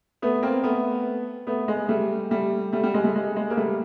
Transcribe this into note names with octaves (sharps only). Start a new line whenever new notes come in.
A3 B3
A#3 C4
A3 B3
A3 B3
G#3
G3 A3
G3 A3
G3 A3
G3
G#3
G3 A3
G#3
G#3
A#3
G3 A3